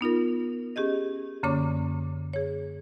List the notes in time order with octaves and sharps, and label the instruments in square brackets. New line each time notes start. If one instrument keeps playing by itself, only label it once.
[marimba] B3 D#4 F4 A#4
C#4 G4 G#4 D#5
F#2 D3 A#3 C#4 C#5 D6
G#4 C#5